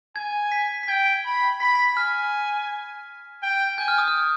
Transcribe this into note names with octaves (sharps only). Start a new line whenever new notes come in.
G#5 G#6
B6
B6
G5 G#6
B5
B5 B6
B6
G#5 F6
G5
G#5 G6
F6
D#6
F6